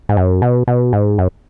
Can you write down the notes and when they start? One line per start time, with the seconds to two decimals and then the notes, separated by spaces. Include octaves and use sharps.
0.09 G#2
0.17 F#2
0.42 B2
0.68 B2
0.93 G#2
1.18 F#2